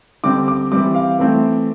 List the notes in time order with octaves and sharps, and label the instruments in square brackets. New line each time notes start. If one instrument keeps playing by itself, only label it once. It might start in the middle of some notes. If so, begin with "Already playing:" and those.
[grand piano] D3 G3 C4 D6
D6
E3 G3 C4 D6
F5
E3 A3 C4